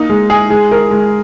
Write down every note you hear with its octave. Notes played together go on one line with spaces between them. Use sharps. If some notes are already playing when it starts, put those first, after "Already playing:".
Already playing: A#3 D#4
G#3
G#4
G#3
A#4
G#3